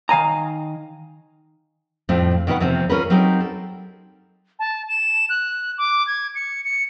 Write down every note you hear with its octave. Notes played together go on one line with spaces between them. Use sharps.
D#3 F5 G#5 A#5
F2 A2 C4 F4
B2 D#3 G#4 B4 F#5
E2 C3 F3 C4
C#4 F4 A#4 B4
F#3 C4 D#4 G4 A#4
A4
A5
E7
F#6
D6
G#6
C#7
C#7